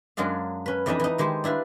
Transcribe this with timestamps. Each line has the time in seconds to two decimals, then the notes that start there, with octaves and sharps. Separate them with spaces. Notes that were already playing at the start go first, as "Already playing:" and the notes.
0.17 F#2 F#3 G#3 D4 F5
0.66 C#4 B4
0.86 F2 E3 D4 D#4 D#5 E5
1.00 E3 D#4
1.18 D#3 G#3 G4 C5
1.44 D4 E4 B4 F5